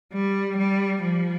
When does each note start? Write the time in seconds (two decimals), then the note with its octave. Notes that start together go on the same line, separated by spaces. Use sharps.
0.13 G3
0.58 G3
1.04 F3